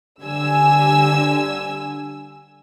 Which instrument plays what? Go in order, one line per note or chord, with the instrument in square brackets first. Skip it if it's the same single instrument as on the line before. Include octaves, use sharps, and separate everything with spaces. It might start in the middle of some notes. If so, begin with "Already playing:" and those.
[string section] D3 G3 G#5 E6